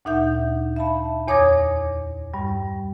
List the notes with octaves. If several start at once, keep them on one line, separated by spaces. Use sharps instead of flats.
D2 A#2 D#4 E5 F#5 G6
E5 F5 A5 B5
E2 C#5 D6 D#6 G#6 A#6
G2 G3